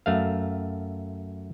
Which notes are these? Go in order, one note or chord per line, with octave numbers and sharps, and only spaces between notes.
F#2 A3 F5